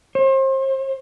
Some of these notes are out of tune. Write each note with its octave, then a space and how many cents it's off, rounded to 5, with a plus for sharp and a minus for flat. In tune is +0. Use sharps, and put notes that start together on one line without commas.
C5 +35